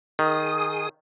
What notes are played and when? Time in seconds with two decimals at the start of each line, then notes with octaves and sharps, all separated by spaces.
0.19 D#3 G#4 D#6